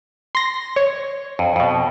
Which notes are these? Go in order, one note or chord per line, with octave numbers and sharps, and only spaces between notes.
C6 A#6
C#5
F2
F2 B2